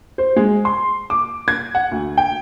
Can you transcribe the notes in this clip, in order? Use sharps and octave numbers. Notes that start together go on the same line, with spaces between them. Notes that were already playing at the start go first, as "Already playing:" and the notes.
C5
G#3
C6
D6
G#6
F#5
D2
G5